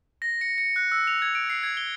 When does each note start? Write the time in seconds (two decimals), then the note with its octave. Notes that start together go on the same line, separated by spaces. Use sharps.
0.22 A#6
0.41 C#7
0.58 C#7
0.76 F#6
0.92 E6
1.07 F7
1.22 G#6
1.35 D7
1.50 C7
1.63 G#6
1.77 G7